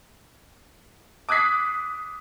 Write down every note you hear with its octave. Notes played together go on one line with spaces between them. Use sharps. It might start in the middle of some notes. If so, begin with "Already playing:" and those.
D6 D#6 F#6 G#6 B6 C7